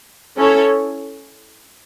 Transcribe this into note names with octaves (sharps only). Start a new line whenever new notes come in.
C#4 E4 A4 C#5